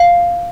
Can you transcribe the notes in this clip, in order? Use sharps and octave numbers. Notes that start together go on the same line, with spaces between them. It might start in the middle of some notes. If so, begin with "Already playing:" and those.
Already playing: F5